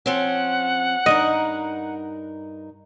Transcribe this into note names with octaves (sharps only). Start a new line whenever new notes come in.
F3 C4 C#4 F#5
G2 D#4 A#4 D#5